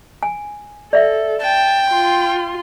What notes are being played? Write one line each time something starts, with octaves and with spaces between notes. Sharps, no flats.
G#5
A4 D5 E5
G5 A5
F4 C6